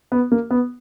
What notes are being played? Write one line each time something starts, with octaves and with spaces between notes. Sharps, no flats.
B3
A#3
B3